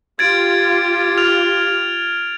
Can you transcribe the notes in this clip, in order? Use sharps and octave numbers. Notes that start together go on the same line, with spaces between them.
F4 G4 G#6 A6 D7
F6 F7